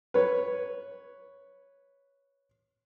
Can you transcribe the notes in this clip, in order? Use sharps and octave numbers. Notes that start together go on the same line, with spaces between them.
B4 C#5